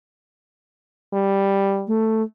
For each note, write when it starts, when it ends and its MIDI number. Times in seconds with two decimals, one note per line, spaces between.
1.14 1.87 55
1.87 2.23 57